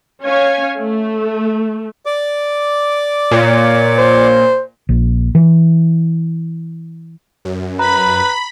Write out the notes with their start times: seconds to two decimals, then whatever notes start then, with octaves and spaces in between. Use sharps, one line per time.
0.23 C#4 C#5 F5 G#5
0.77 A3
2.06 D5 D6
3.31 A#2 C#5
3.98 C5
4.89 A#1
5.35 E3
7.45 F#2
7.79 B4 A#5 B5